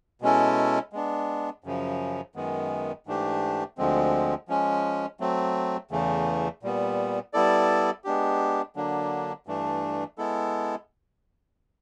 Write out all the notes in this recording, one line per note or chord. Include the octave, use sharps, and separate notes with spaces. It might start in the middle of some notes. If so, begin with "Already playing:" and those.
B2 G#3 C#4 E4 A4
G#3 B3 D4
F#2 C#3 F3
F#2 D#3 G#3 B3
G#2 E3 A3 D4 G4
D2 D3 F3 G#3 C4
F3 G#3 C#4
F#3 A3 C4
E2 C#3 E3 A3
A#2 G3 B3
G3 B3 E4 A4 D5
G#3 B3 D4 G4
D3 F#3 A#3 D4
G2 E3 A3 D4
G#3 B3 E4 A4